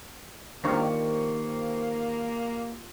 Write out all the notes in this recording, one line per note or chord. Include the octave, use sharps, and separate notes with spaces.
D#3 A#3 D4 F4 G4 C5 D5 C#6